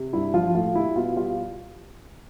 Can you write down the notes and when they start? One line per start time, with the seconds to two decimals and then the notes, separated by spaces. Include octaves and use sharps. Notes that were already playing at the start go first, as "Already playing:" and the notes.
Already playing: C3
0.13 G2 E4
0.34 F3 F4
0.55 A2 F4
0.75 G3 E4
0.96 B2 F4
1.16 G3 F4